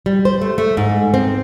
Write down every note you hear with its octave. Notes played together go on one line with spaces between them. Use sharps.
G3
C5
A3
A3
G#2
C4